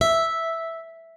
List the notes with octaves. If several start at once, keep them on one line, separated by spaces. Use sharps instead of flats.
E5